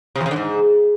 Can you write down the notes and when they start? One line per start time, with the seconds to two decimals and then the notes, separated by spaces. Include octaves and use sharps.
0.16 C3
0.21 E2
0.26 C3
0.31 D3
0.36 G#2